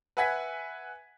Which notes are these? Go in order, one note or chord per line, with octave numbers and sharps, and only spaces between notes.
B4 E5 F#5 G#5 G#6 B6